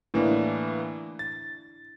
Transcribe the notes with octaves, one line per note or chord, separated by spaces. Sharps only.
A2 E3 A#3 D4 E4
A6